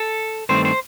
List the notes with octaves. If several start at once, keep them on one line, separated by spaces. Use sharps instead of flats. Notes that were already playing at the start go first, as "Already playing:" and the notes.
Already playing: A4
G2 D#3 A3 C4 C5
C5